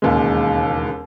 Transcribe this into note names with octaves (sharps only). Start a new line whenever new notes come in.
E1 D#2 C#3 G#3